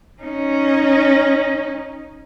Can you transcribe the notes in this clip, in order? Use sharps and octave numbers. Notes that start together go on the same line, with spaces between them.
C#4 D#4